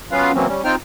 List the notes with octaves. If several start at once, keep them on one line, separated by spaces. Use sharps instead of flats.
F#3 B3 C#4 F4 B4 F5
C#3 E3 F#3 A#3 C4 C#4
G3 C#4
C4 D#4 F4 C5 G5 F6